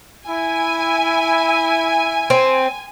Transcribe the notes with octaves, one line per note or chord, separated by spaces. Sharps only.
E4 G#5
C4